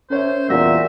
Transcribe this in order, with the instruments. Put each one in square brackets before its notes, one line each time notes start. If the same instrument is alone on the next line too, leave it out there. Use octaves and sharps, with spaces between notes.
[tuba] C#4 [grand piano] A#4 C#5 E5 [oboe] C5
[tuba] E2 [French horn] A#2 [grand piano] G3 F#4 A#6 [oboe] E5